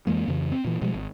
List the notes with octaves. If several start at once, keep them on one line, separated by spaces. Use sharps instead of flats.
F2 E3 G#3 A#3
F2 C#3 E3
C4
A#2 E3
B2 F3 G3 G#3
G#1